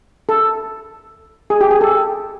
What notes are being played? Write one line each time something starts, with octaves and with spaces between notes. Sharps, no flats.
A4
G#4
G4
G#4
A4